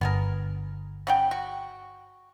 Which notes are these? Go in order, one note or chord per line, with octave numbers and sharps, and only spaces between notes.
G1 B3 G#4 A#4
C#3 F#5 G5
F#4